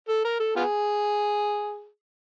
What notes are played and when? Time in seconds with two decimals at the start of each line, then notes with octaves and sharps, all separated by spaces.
0.09 A4
0.25 A#4
0.40 A4
0.56 B3 F4 G#4